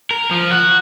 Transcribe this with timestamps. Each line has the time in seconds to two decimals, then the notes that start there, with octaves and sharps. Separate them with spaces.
0.11 A#4
0.31 F3
0.51 F#4